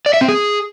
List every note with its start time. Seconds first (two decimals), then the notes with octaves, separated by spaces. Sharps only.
0.06 D5
0.14 E5
0.21 C4
0.29 G#4